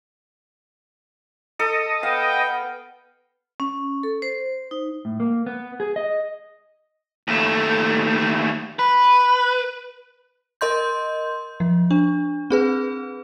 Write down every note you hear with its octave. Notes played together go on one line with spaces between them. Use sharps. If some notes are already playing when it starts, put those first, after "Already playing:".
A4 D#5
B3 F5 G5
C#4
A4
C5
D#4
A2
A#3
B3
G#4
D#5
D#2 A3
B4
A#4 D#5 C6 G6
F3
D4
C4 G#4 B4